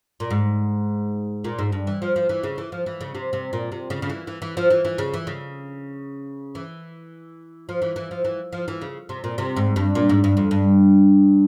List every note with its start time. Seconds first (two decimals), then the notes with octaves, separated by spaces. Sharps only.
0.20 A#2
0.31 G#2
1.44 A#2
1.59 G#2
1.72 G2
1.87 E3
2.02 F3
2.16 F3
2.29 E3
2.43 C#3
2.58 E3
2.72 F3
2.86 E3
3.01 C#3
3.15 C3
3.33 C3
3.53 A#2
3.72 C3
3.90 C#3
4.02 C#3
4.10 E3
4.27 E3
4.42 E3
4.57 F3
4.70 E3
4.85 E3
4.98 C#3
5.14 E3
5.27 C#3
6.55 E3
7.69 F3
7.82 E3
7.96 E3
8.11 F3
8.25 E3
8.53 F3
8.68 E3
8.81 C#3
9.09 C3
9.24 A#2
9.38 C3
9.56 G#2
9.76 G2
9.95 A#2
10.09 G#2
10.24 G2
10.37 F2
10.51 G2